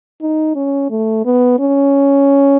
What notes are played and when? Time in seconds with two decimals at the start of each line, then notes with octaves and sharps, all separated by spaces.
0.21 D#4
0.56 C#4
0.90 A3
1.25 B3
1.59 C#4